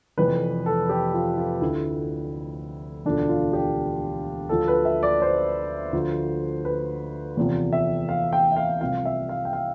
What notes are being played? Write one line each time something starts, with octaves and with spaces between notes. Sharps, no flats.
F1 F2 E3 B4
A4
G4
F4
F4
D2 D3 F3 E4
E1 D2 D3 F3 D4
F4
G4
D2 D3 F3 A4
B4
E5
D5
C5
D2 D3 F3
B4
E2 C3 F3
E5
F5
G5
E5
F5
C2 C3 F3 F5
E5
F5
G5
F5